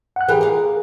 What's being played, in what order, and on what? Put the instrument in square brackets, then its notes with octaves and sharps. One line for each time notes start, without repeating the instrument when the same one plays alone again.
[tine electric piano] F#5 F#6
[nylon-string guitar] E3 G4 A#4 [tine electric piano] G#4
[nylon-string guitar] A#4 F5